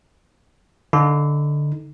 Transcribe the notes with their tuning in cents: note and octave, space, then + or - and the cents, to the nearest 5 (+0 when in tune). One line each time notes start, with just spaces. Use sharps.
D3 +0 D#4 +0